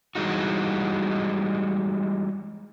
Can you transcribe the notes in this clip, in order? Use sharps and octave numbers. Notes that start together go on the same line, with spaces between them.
E3 G3 G#3 D#4 F#4